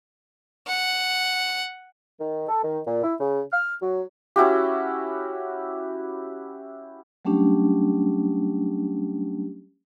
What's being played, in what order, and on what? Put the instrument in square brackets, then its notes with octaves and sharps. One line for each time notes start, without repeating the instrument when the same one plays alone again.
[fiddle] F#5
[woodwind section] D#3
A4
D#3
A#2
E4
C#3
F6
F#3
[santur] C#4 E4 F#4 G4
[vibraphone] F#3 G3 A3 C#4 D4 G4